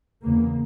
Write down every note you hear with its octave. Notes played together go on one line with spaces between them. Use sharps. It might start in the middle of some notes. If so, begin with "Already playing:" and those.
E2 C#3 A#3